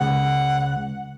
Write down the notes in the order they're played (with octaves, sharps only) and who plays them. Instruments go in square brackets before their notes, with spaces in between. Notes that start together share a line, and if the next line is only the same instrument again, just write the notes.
[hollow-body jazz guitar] C#2 [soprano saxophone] F#5